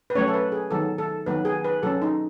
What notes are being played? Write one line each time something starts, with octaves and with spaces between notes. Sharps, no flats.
B4
F#3 A3 C#4 C#5
A4
B4
G#4
D#3 F#3 B3 A4
A4
D#3 F#3 B3 B4
G#4
B4
F#3 C#4 A4
D#4